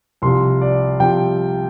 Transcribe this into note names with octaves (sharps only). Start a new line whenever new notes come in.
C2 C3 F3 C6
D5
C2 C3 F3 G5